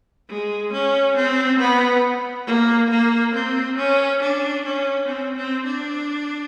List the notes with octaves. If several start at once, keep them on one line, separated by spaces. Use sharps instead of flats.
G#3
C#4
C4
B3
A#3
A#3
C4
C#4
D4
C#4
C4
C4
D4